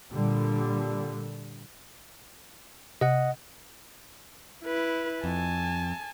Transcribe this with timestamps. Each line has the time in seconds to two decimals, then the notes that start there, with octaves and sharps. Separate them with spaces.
0.10 A#2 D3 G3
3.01 C3 D#5 F#5
4.64 E4 B4
5.24 F2 G#5 A5